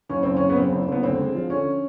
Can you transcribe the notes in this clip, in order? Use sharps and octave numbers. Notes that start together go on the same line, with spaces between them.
F#1 C#4
F#1 C4
C#3 C#4
B3
F#2 C4
F#1
F#1 B3
D2 C4
G#3
F3
D3 C#4